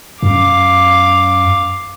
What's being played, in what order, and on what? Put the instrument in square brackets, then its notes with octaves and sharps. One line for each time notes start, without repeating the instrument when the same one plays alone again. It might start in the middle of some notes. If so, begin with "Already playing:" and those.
[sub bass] F#2 [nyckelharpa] F5 D6